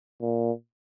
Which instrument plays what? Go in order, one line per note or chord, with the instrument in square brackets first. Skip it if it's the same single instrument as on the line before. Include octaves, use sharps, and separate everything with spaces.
[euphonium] A#2